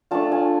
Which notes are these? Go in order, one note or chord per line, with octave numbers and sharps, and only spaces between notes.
A3 D4 F4 A5
G#5